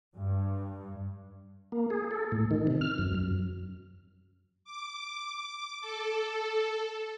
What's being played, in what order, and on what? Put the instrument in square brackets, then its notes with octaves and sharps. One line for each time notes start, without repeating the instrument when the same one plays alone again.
[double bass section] G2
[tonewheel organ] A#3
G#4
A4
A2
D#3
C3
F6
F#2
F#2
[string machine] D6
D6
A4